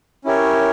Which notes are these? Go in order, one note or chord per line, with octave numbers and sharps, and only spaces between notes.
C#4 E4 G4 A#4 C#5